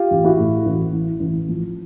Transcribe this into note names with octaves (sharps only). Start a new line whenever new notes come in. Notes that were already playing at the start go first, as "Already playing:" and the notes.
Already playing: F4 G4
A1
E4 F#4
A2
A1
E3
A1
F3